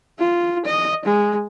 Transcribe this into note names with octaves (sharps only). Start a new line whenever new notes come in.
F4
D#5
G#3